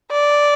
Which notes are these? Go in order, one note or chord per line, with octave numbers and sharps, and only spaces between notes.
D5